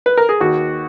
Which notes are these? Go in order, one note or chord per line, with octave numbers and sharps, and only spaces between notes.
B4
A#4
G#4
D#2 F#4